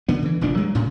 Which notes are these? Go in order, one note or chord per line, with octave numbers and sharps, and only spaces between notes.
D3 B3
D3 E3
F1 A#1 A#2 D4
G2 F#3 G#3
D2 A2 C#3